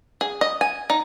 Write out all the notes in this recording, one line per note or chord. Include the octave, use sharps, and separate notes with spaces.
G#4
D#5
G#5
D#4